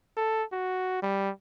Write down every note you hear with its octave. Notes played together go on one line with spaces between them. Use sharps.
A4
F#4
G3